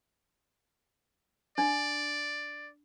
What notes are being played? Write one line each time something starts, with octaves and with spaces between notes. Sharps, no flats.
D4 D5